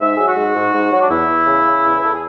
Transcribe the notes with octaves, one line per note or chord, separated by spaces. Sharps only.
G#2 E5
F#3 G#4
F#4
G#2
G#2
G#2
F#3
D4
E2 E4
E2
C#3
C#3
E2
B4
E2 A4
G#4